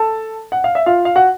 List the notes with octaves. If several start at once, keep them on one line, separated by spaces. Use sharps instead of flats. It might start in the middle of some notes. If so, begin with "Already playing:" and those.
Already playing: A4 A5
F#5
F5
E5
F4 F5
F5
F#4 F#5